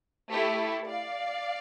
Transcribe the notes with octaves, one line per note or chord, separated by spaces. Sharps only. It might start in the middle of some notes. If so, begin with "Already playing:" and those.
A3 E4 G4 A4
A4
D5 F5